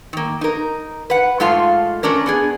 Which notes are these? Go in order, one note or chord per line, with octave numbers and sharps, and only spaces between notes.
D#3 A#3
D#4 A#4
B4 F#5
G#2 A3 F4 F5 A5
A3 C#4 D4 A#4
B3 D4 G#4